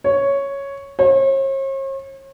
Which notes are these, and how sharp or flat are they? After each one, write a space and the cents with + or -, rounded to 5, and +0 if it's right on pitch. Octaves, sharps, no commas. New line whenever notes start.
C#5 +0
C#5 -45